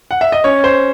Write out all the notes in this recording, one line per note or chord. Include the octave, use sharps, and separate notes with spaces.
F#5
E5
D#5
C#4 C#5
C5